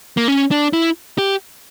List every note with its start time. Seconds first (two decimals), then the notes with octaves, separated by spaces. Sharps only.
0.17 A#3
0.28 C#4
0.51 D4
0.73 E4
1.18 G4